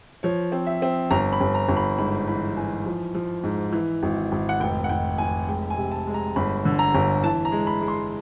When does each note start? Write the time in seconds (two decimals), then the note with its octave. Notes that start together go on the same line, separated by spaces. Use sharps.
0.23 F3 C#5
0.52 C4
0.67 E5
0.82 C4
1.11 G1 A#5
1.33 B5
1.41 G1
1.55 A#5
1.69 G1
1.77 B5
1.98 G#2 B5
2.28 E3 B5
2.57 E3 G#5
2.86 F3
3.15 F3
3.44 G#2
3.73 E3
4.03 G#1
4.32 G#1
4.49 F#5
4.60 F1 G5
4.84 F#5
4.89 F1 G5
5.18 F1 G#5
5.48 G#3 G5
5.70 G#5
5.77 C3
5.92 A5
6.07 G#3
6.14 A#5
6.36 G1 B5
6.65 D3
6.79 A#5
6.95 G1
7.24 E3 A5
7.45 A#5
7.52 G#3
7.67 B5
7.81 G#3
7.88 C6